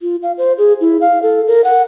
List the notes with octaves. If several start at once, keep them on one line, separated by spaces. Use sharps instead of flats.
F4
F5
C5
G#4
E4
F5
A4
A#4
F#5